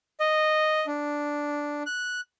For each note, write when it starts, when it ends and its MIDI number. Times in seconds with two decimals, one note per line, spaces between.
0.20 0.86 75
0.87 1.83 62
1.86 2.21 90